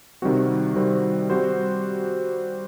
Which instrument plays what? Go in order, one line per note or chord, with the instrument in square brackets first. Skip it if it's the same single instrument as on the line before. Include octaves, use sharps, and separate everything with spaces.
[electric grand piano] C3 D#3 G3 C4 F#4
C3 D#3 G3 C4 F#4
G3 C4 F#4 C5